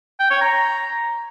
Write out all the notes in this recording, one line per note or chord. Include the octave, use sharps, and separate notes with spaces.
G5
C#5
A#5